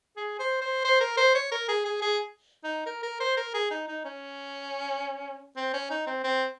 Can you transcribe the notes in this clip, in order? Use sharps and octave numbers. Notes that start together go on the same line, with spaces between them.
G#4
C5
C5
C5
A#4
C5
C#5
A#4
G#4
G#4
G#4
D#4
A#4
A#4
C5
A#4
G#4
D#4
D#4
C#4
C4
C#4
D#4
C4
C4